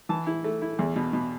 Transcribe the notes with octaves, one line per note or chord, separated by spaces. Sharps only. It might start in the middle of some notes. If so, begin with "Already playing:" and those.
E3 A5
E4
A3
E4
E2
B2
B2